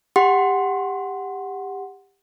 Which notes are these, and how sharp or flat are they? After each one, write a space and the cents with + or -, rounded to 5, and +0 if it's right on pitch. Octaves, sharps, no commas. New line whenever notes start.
G4 +20 F#5 +0 C6 +0